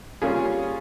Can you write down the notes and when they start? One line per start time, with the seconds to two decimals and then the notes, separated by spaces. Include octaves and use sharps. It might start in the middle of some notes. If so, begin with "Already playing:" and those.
0.22 G3 A#3 C#4 F4 G#4